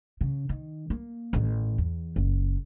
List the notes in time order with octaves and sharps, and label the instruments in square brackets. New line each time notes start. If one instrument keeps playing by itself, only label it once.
[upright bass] C#3
D#3
A#3
A1 D#3
E2
F#1